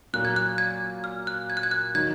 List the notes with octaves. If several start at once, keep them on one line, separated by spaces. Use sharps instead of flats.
A#2 F#3 A#3 F#6
G#6
F#6
G#6
F6
F#6
G#6
F#6
G#6
F#6
D#3 F#3 G#6